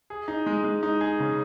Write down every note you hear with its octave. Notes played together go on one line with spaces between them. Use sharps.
G#4
D#4
G#3
G#3
D#4
G#4
C#3